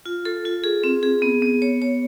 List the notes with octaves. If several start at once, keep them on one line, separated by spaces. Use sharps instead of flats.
F4
A4
F4
G#4
C4
G#4
B3
B3
C#5
C#5